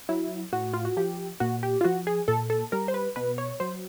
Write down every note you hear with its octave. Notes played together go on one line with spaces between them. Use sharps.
F#3 E4
A2 F#4
F4
F#4
F3 G4
A#2 F#4
G4
F4
F3 F#4
G#4
A#2 A4
A4
G3 A#4
C5
B4
B2 B4
C#5
F#3 C5